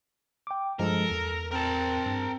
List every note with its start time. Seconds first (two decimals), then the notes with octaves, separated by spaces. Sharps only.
0.47 G5 D6
0.79 G2 F3 G#3 A4 A#4
1.10 E2
1.51 C4 A#4 A5
2.06 G2